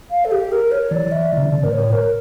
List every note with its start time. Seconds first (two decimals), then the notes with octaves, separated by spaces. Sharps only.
0.11 F5
0.25 A4
0.31 G4
0.52 A#4
0.71 C#5
0.91 E3 D5
1.12 E5
1.32 E3 D5
1.38 C#3
1.43 D3
1.52 C#3 D5
1.63 A2 A#4
1.72 C#5
1.92 A#4